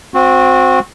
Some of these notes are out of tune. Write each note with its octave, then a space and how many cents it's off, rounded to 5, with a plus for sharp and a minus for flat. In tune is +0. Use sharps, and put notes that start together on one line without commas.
C4 +0 F#4 -25